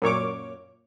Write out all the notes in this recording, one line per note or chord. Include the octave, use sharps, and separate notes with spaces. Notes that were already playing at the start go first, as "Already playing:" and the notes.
F#2 A#2 C#5 D6